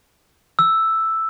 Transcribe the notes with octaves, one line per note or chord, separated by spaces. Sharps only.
E6